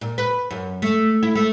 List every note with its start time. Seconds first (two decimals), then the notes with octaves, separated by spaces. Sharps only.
0.01 A#2
0.18 B4
0.50 F#2
0.82 A3
1.23 E4
1.35 A3